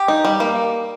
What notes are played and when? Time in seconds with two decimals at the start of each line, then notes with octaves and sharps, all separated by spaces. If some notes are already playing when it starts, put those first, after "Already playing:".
Already playing: G4
0.08 D#4
0.25 G3
0.40 A#3